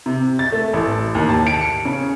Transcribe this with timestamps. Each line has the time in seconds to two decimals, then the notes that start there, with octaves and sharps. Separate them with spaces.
0.06 C3
0.39 A6
0.52 A3
0.73 A1
1.15 D#2
1.29 A5
1.47 D7
1.61 C#7
1.85 C#3